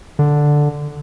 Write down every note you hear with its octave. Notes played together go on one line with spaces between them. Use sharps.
D3